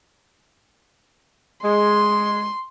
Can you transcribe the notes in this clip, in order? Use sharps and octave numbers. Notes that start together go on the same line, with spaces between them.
G#3 C6